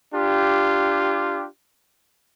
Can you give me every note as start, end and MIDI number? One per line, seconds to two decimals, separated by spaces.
0.14 1.46 62
0.14 1.46 65
0.14 1.46 67